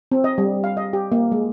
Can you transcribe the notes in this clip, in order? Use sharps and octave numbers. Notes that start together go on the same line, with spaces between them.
C4
D#5
G3
F5
D#5
G4
A#3
G#3